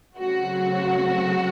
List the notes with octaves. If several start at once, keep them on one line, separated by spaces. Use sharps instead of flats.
C#3 F#3 A3 C4 F#4